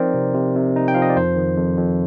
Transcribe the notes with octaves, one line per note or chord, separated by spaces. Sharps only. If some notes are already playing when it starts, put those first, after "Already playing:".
Already playing: F3 C4 D#4 A#4 C5 D5
C3
C3
C3
D#4
G5
F3 F5
D#5
D5
F2 C5
D#3
F2
F2